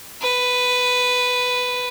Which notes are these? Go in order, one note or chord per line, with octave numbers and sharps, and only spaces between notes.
B4